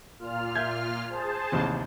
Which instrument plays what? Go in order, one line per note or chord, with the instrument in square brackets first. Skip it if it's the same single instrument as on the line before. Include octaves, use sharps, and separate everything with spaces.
[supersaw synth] A#2 F4 F6
[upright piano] E5 G6 G#6
[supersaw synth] G#4 C5 A5
[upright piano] A1 D#2 C3